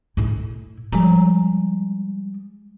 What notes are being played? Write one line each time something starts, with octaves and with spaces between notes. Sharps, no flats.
A2 E4
F3 G3 G#3 A#5